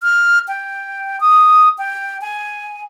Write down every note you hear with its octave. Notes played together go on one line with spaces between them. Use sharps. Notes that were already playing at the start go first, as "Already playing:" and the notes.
F6
G5
D#6
G5
G#5